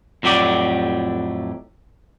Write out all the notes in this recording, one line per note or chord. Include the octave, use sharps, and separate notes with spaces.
F2 A2 F#3 G4 D5